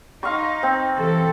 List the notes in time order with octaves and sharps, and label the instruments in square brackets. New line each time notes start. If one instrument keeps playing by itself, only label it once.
[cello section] D#4 [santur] F5 C6 C#6
[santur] C4
[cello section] C3 E3 A4